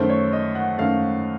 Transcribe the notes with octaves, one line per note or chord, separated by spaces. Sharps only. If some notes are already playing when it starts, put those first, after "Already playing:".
Already playing: F#2 D#3 A3 C5
C#5
D#5
F#5
F#2 D#3 A3 F5